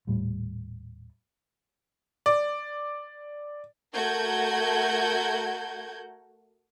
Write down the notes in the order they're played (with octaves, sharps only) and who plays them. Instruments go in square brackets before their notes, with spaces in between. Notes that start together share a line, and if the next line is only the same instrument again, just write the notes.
[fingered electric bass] D#1 A2 G3
[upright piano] D5
[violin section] A3 F#4 A#4 F#5 G6 G#6